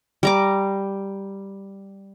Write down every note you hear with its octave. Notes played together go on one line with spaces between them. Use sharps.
G3 A#5 D6